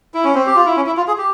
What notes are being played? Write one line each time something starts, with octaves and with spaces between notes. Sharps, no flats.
E4
C#4
C4
G4
F4
E4
C#4
E4
F4
G#4
G4